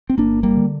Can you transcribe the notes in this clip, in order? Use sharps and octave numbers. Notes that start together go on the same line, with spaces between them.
C4
G1 A#3 D4
G3 A#3
D3